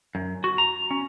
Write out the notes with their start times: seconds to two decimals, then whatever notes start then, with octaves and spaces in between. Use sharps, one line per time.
0.15 F#2
0.44 F#4
0.58 A#5
0.91 C#4